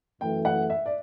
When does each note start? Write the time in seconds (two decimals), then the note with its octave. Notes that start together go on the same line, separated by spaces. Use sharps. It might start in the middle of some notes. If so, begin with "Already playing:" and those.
0.21 F#2 E3 A3 G5
0.45 F#5
0.70 E5
0.86 D5